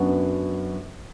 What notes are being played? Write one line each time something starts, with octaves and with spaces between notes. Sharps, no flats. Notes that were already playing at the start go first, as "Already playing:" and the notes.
Already playing: F#2 F#3 B3 D4 F#4